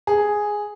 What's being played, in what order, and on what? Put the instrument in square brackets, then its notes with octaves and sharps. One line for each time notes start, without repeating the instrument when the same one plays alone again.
[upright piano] G#4